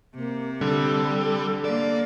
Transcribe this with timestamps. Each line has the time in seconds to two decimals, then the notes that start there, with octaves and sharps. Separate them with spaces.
0.15 C3 A#3
0.61 D3 G3 A4
1.65 A#3 D5